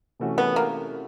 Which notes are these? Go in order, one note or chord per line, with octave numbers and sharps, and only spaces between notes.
C3 E3 A3 C#4 F#4
B3
A#3